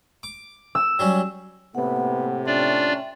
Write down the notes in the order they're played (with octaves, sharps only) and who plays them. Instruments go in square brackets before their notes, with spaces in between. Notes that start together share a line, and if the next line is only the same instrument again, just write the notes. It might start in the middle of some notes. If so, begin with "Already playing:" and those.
[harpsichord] D6
[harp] E6
[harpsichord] F#3 G3 C#4
[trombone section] A2 C3 [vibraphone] A#3 F#5 [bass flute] B3
[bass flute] C#4 [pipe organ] D4 F4 D5 [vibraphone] E5 G5